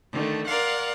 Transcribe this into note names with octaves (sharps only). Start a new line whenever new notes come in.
D3 D#3 A3
A#4 D5 F5 F#5 C6